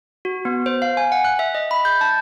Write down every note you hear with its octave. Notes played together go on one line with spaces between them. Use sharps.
F#4
B3
C5
F5
G#5
F#5
F#6
E5
D#5
B5
G6
A5